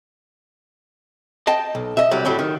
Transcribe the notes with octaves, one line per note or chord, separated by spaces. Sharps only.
D#5 G5 A5
B1
D#5 E5
C2 F#3 G3
A2 F#3 G3
D#3